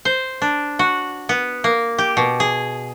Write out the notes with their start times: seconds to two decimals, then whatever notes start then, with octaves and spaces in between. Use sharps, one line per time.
0.05 C5
0.42 D4
0.79 F#4
1.29 B3
1.64 A#3
1.98 G4
2.17 B2
2.40 G#4